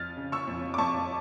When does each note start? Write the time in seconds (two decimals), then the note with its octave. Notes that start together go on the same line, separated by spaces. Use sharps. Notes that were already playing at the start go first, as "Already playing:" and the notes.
Already playing: F2 F6 A6
0.17 C#3
0.32 C#6 E6
0.47 F2
0.74 D6
0.78 F2 A5 C#6